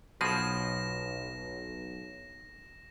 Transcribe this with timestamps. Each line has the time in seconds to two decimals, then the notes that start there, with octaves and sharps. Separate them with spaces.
0.21 B1 B2 F3 G#4 A#6 E7